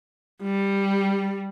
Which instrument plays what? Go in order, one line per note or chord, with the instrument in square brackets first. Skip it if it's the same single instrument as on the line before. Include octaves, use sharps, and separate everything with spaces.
[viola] G3